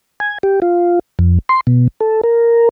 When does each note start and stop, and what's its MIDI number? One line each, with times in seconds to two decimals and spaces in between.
0.20 0.38 80
0.43 0.60 67
0.62 0.99 65
1.19 1.39 41
1.49 1.61 84
1.67 1.88 47
2.00 2.21 69
2.24 2.69 70